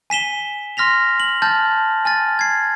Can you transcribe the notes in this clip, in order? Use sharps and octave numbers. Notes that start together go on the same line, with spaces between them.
G#5 B6 E7 G7
C6 F6 A#6 B6 F7
F#7
A5 F6 G6 A6
G#5 F6 A6
G#6 C7